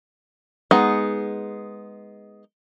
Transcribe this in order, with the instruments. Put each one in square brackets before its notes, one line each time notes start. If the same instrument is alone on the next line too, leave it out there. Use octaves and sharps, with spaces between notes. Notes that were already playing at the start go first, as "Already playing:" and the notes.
[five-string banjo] G#3 B3 D#4 G#4 F#5